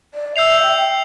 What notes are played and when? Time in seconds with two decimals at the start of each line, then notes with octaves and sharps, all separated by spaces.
0.14 D5
0.35 E5 E6 G6 C7 F7
0.63 G5